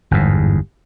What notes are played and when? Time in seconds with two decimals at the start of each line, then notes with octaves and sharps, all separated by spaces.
0.11 G1 E2 G#2